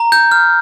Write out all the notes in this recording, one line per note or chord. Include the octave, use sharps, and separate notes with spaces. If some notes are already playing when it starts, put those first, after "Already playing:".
Already playing: A#5
G6
F6